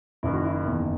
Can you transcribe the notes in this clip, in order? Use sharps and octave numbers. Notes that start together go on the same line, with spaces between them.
F#1 F#2 D#3 E4
F#4
E4
E4
F#1 E2 D#3